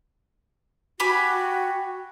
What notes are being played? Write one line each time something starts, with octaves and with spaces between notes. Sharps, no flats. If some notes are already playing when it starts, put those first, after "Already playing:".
F#4 G4 G#5 B5